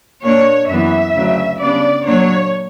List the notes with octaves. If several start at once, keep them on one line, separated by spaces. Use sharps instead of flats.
A#2 A#3 D4 C#5
F#2 E3 B3 E5
D2 C#3 F#3
C#3 G3 B3 D4 D5
A#2 F#3 A#3 D4 C#5